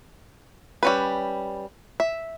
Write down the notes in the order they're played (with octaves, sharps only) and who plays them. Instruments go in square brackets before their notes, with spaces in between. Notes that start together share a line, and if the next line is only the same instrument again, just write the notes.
[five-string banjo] G3 C#4 B4
E5